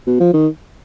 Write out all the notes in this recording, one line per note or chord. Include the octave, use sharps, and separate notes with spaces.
B2
F3
D#3